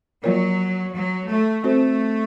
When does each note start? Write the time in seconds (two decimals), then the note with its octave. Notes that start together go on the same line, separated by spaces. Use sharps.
0.23 F3 F#3 A#3 F4 A#4 C#5
0.94 F#3
1.29 A3
1.64 A3 C4 F#4 A4 C5